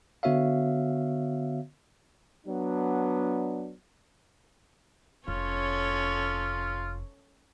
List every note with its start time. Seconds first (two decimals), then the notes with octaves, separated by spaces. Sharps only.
0.23 D3 B3 F#4 C#5 E5 F5
2.47 F#3 B3 D4
5.28 F1 C#4 F4 A4 C#5